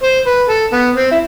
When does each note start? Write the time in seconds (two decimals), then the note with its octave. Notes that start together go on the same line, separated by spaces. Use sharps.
0.03 C5
0.26 B4
0.49 A4
0.72 B3
0.95 C4
1.11 E4